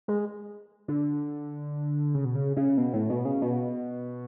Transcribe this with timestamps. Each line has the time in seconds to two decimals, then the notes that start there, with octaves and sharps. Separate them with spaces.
0.08 G#3
0.88 D3
2.15 C#3
2.25 B2
2.35 C#3
2.56 C#3
2.78 B2
2.93 A2
3.10 B2
3.25 C#3
3.42 B2